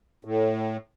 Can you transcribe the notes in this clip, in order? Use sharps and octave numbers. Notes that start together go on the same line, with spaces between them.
A2